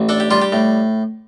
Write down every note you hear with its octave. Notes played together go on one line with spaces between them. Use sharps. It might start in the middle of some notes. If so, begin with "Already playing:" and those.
Already playing: A1
D4 A4
G4
G3 F4
G4
A2